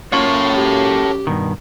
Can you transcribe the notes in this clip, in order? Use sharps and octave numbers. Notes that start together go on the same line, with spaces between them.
F#2 A#3 F4 F#4 A4 C#5 C#6
G4
G2 B2 D#3